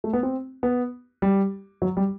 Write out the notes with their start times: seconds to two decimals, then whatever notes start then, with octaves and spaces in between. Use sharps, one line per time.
0.04 A3
0.13 B3
0.23 C4
0.63 B3
1.22 G3
1.82 F#3
1.97 G3